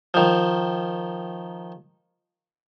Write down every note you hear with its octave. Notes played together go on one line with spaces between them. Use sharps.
D#3 F3